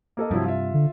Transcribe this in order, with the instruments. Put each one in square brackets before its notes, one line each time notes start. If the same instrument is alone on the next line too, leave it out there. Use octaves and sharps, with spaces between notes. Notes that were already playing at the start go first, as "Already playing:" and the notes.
[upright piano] A#3 A4 D#5
[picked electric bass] G2 C3 [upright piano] F3 F#3 E4
[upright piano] F4 E5
[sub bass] D3